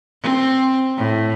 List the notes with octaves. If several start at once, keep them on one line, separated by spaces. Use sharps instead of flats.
C4
A2